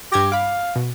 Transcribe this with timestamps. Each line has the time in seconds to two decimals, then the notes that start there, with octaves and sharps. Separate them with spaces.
0.12 G2 G4 G#6 A#6
0.32 F5 B5 D6
0.76 B2